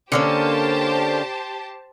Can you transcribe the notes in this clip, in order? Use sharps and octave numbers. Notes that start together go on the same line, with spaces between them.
D3 A#3 C#4 G4 C5 A5